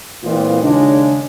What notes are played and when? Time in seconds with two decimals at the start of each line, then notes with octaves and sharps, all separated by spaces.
0.23 A#2 E3 G#3 B3 C4 F4
0.62 D#2 C#3 G#3 D4